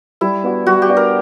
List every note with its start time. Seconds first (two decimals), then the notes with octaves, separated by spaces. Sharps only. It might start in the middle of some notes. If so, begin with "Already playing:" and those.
0.21 G3 E4
0.44 B3 D4 F#4
0.67 G3 F#4
0.82 G4
0.89 B3 D4 F#4
0.97 A#4